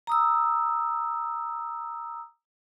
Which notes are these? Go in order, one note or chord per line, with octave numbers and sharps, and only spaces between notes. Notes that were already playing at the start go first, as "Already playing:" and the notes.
A#5 D#6 E6